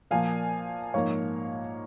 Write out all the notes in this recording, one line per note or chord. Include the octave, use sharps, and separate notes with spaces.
A#2 F3 A#3 F5 G#5
G#2 F3 A#3 C#5 F5